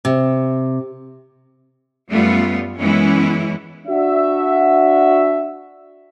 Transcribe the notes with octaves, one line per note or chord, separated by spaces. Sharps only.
C3
F#2 G3 A3 B3 F4
F#2 E3 G#3 B3 C#4 E4
D4 F#4 E5